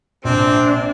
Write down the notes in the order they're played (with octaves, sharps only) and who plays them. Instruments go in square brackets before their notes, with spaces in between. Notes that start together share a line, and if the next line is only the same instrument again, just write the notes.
[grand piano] A#1 C3 [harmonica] C4 [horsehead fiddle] D4